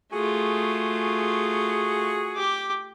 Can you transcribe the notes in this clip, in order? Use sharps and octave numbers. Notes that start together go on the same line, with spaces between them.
A3 F4 F#4 G#4
G4 D6